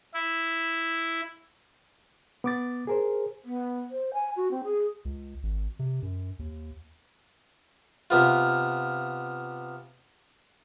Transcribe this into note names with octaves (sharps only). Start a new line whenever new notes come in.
E4
B3 D6 A6
G#4 A#4 C5
B3
C5
G#5
F#4
C4
G#4
C#2
G#1
C3
F#2
D#2
C3 B3 F4